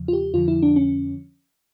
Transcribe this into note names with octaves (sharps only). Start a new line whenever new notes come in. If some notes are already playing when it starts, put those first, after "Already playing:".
Already playing: E2 C#3 F3
F4
G4
F2 D3 F3 F4
E4
D4
C#4